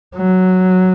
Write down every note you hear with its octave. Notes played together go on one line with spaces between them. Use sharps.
F#3